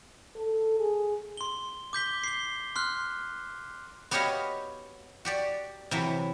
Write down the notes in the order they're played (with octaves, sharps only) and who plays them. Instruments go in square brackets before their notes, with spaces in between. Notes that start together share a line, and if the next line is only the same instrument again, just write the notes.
[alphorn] A4
G#4
[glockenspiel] C6 G7
D6 G6 B6 G7
C7 G7
C6 F6 F#6
[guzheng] B3 F#4 G4 C#5 D#5 F5
F#4 G4 D5
C3 E3 F#3